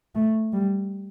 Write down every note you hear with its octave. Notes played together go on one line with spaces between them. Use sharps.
A3
G3